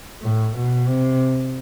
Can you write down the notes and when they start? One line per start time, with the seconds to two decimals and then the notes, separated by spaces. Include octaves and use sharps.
0.22 A2
0.56 B2
0.88 C3